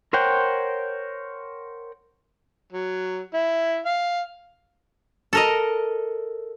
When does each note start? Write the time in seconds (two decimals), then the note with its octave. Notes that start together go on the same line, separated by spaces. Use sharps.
0.13 A#4 C5 C#5 F#5 G5
2.72 F#3
3.34 E4
3.86 F5
5.33 A4 A#4 D#5